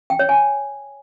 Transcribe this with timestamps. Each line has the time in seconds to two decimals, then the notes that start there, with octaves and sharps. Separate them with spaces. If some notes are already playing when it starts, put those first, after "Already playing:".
0.10 G5
0.19 C#5
0.29 G#5